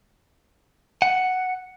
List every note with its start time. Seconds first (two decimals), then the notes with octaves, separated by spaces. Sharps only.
1.02 F#5